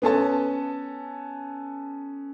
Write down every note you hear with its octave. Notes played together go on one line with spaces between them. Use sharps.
B3 C#4 A4 A5